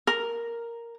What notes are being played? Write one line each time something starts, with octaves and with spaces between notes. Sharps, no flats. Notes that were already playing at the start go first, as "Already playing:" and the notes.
A#4